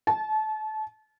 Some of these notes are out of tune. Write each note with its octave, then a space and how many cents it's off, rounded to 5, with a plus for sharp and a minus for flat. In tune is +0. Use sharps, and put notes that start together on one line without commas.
A5 -30